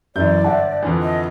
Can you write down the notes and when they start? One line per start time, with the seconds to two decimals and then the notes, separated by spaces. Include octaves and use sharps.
0.16 F#2 E3 D5 G6
0.44 G1 E5 F#5 A5
0.83 F2 D3 E3
1.02 D#5